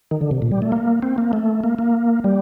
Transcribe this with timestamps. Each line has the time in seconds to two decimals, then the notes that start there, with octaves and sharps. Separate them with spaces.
0.11 D#3
0.21 D3
0.31 C3
0.42 A#2
0.51 G3
0.62 A3
0.72 A#3
1.03 C4
1.18 A#3
1.33 A3
1.64 A#3
1.79 A#3
2.24 G3